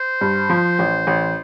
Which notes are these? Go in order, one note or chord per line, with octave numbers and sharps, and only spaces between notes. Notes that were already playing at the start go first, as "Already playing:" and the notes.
Already playing: C5
G2
F3
A1
A1